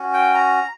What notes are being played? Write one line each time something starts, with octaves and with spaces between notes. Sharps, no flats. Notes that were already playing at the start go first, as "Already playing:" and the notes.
Already playing: C#4 F#4
G5
A#5